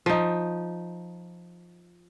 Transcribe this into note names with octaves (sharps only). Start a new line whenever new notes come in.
F3 D#4